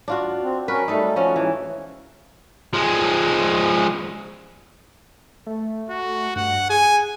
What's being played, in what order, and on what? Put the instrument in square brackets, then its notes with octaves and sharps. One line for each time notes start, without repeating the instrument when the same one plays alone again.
[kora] D4 F4 F#4
[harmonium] C4
[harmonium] C#4 F#4 A#4 [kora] B4
[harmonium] G3 A3 [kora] D#4 A4
[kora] F3 C#4 [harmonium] F#4
[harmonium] G#2 [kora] E3
[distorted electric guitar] F3 G#3
[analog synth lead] A3
[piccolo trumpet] F#4
[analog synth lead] G2 [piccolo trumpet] F#5
[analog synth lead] G#4 [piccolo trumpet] G#5